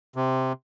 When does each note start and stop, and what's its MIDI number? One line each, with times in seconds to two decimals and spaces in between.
0.16 0.52 48